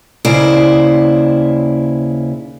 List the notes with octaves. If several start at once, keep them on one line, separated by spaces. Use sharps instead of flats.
D#2 C#3 E4 C5 D5